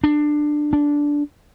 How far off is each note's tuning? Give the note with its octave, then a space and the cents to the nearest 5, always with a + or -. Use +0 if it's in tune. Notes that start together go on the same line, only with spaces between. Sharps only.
D4 +15
D4 -10